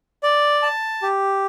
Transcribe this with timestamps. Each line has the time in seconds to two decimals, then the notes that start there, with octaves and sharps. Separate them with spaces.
0.23 D5
0.63 A5
1.02 G4